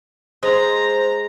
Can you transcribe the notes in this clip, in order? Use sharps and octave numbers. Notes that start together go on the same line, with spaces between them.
G#3 C5 A#5